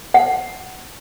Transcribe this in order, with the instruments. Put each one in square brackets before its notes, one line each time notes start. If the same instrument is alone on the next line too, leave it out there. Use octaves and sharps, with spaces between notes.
[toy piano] F#5